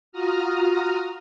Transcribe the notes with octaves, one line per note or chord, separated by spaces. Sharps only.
F4 F#4 A#5 D#6 F6